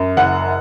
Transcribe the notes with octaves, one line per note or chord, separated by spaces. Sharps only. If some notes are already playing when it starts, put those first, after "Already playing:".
Already playing: F#2
F#1 F#5